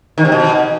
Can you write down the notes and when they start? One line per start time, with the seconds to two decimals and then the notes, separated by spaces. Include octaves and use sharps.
0.18 D#3
0.25 C3
0.32 B2